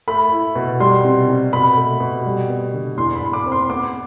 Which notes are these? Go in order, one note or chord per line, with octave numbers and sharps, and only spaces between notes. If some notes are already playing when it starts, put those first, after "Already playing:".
A3 B5
E4
B2
G3 C6
C3
C3
B2 B5
A3
B2
G3
B3
D3
E2 C6
B5
E2
D6
C4
C6
B3 D6